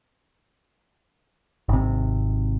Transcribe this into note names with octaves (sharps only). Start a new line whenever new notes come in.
G#1 C3